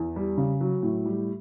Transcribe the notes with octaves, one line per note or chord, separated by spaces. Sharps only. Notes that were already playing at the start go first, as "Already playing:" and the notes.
Already playing: E2
G3
C#3
F#3
A2
G3